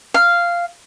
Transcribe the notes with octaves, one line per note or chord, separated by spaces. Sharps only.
F5